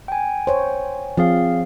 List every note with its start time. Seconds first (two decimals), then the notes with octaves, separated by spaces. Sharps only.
0.08 G5 G#5
0.47 C5 C#5
1.17 F3 C4 G#4 F5